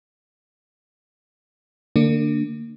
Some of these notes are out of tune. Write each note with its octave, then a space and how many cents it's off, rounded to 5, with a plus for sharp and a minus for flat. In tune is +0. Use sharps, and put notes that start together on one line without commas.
D3 +20 A#3 -35 D4 +0